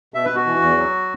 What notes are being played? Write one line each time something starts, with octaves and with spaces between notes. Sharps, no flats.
B2 E5
B4
B2
F#4
E3
E2
F#3